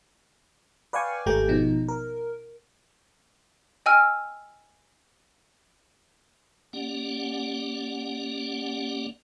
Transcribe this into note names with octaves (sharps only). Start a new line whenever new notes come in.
B4 D5 F5 G5 G#5 C#6
G#1 A3 G4 G5 A#5
B2 F3 D#4
A#4
D#5 G5 G#5 E6 F6
A#3 C#4 G4 D5 F#5